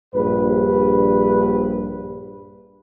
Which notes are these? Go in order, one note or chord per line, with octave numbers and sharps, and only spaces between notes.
A#1 G2 B4